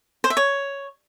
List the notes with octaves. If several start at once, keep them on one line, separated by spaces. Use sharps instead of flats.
C5
E5
C#5